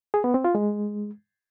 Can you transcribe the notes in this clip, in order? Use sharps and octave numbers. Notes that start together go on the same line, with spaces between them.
G#4
B3
C4
F4
G#3